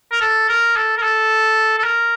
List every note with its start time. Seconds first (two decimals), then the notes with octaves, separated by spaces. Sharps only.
0.12 A#4
0.21 A4
0.49 A#4
0.76 A4
0.98 A#4
1.03 A4
1.78 A4
1.84 A#4